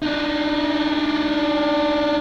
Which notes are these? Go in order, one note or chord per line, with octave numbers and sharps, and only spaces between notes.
D4 D#4